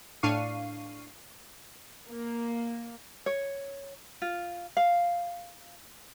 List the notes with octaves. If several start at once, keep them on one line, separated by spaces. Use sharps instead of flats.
A2 D4 F5 C#6 C7 D#7
A#3
C#5
F4
F5